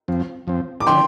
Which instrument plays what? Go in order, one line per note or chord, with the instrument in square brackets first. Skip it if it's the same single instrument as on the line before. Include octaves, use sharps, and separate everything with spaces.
[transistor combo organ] F2 F3 C4
F2 F3 C4
[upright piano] D6
[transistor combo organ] D3 F3 D4 [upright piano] G5 C6